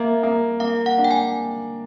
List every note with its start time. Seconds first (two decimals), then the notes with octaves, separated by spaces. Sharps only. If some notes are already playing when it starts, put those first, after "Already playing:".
Already playing: A#3 E5
0.23 A#3
0.60 A#3 F5
0.86 F#5
0.98 D4
1.04 G5
1.11 G#5